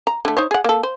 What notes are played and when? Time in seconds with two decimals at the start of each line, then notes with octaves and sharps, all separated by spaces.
0.07 A#5
0.25 D3 A3
0.37 D#4 C5 C#5
0.51 G#4 F#5
0.64 A#3 A4
0.83 C5